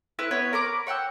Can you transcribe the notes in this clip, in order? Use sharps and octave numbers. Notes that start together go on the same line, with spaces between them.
E4 B4 F#6
B3 B4 C#5
A#4 B5 D6
C#5 F#5 G5 E6